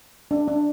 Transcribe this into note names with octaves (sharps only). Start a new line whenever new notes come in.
D4
D4